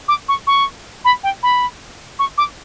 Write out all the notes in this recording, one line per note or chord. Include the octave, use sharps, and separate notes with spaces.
D6
C#6
C#6
B5
G5
B5
C#6
D6